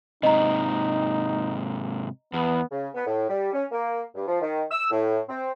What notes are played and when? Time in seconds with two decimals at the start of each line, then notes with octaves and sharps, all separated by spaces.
0.23 G#2 C3 D#4 D#5 A#5
2.33 E2 B3
2.71 C#3
2.94 B3
3.06 A2
3.29 G3
3.53 C#4
3.72 A#3
4.15 G2
4.26 F3
4.41 D#3
4.71 E6
4.91 A2
5.29 C4